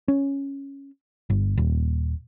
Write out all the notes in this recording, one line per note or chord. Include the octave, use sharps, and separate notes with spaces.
C#4
G1
D#1